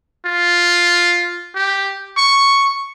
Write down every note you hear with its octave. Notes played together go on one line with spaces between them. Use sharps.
F4
G4
C#6